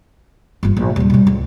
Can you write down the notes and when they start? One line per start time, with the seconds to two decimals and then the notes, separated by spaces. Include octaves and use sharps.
0.63 G1 F4
0.77 A#1 G#2
0.96 D#1 G3
1.10 B2 G3
1.27 C#2